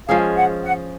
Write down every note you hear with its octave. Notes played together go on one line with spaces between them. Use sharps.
F3 G#3 C#4 G#4 F5
F#5
F#5